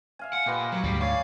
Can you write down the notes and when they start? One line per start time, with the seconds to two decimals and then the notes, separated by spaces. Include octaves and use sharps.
0.19 E5 F5 G#5
0.33 F#5
0.46 A#2 G4 B4 D#5
0.72 F#3
0.84 D2 G#2 G3
1.01 C#5 D5 F5 G#5